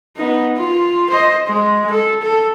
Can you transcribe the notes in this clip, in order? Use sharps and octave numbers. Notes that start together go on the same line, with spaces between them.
B3 D#4
F4
C5 D#5
G#3
A4
A4